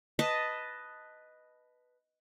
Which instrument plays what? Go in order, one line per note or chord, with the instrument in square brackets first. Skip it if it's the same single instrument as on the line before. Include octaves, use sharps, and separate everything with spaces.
[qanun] B4 D#5 A5